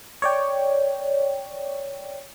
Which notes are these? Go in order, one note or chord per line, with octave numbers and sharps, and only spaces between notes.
C#5 D5 G5